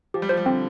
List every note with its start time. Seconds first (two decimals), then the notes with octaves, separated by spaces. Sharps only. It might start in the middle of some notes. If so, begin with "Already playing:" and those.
0.14 F3 G4
0.22 G3
0.29 F3 C5
0.38 G3
0.46 D3 C4